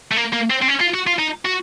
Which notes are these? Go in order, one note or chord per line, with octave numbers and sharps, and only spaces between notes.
A3
A#3
A#3
C4
C4
C#4
F4
F#4
F4
D#4
F#4